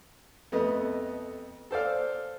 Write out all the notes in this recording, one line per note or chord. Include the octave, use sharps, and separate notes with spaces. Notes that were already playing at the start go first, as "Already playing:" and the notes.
F2 A3 B3 D#5
A4 C5 D5 F5